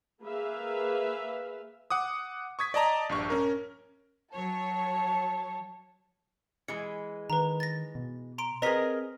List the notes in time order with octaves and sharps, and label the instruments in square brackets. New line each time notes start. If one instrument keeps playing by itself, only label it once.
[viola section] A#3 G#4 B4 E5 F5
[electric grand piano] F#5 D6 D#6
C#6 D#6 G#6 B6
D5 D#5 A5 A#5 D#6
A#1 G2 C#6
C#4 A#4
[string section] F#3 C#5 [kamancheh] A5
[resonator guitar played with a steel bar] E3 G#3 [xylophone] C#7
[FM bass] D#3 [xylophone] B4 A#5
[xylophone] A6 A#6
[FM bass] B2
[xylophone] A#5 C6 D7
[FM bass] C4 [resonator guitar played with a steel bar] G#4 A#4 D#5 [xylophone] B4 A#5 B6